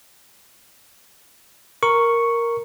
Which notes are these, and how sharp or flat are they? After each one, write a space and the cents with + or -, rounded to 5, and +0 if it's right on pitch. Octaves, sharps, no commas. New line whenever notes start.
A#4 +0 C#6 +0